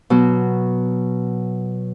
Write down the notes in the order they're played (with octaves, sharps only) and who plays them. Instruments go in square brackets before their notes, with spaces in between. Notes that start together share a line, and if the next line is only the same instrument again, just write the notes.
[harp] B2 F#3